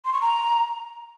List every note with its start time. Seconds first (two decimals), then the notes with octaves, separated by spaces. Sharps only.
0.05 C6
0.13 C#6
0.21 A#5